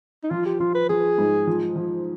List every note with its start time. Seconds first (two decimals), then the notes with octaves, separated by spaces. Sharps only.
0.24 D#4
0.31 F3 F4
0.46 G4
0.60 F3 F4
0.75 B4
0.89 F3 G#4
1.18 G#2
1.47 F3
1.76 F3